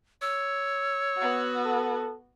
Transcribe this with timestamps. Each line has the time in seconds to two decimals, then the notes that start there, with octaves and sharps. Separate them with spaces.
0.22 C#5 E6
1.18 B3 F#4
1.65 A4